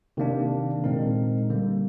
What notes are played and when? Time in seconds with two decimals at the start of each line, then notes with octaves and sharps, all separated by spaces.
0.17 C3 D#3 A#3 D4
0.84 A#2 G#3 C4 D#4 A#4
1.50 D3 G3 A#3